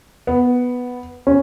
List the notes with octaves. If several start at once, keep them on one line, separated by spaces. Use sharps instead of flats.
B3
C#4